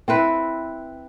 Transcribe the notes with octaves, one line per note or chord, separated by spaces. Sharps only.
C4 E4 B4 C5